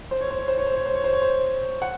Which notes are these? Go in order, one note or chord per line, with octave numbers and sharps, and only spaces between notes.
C5
C#5
C5
C#5
C5
C#5
C5
C#5
C5
C#5
C5
C#5
C5
F#5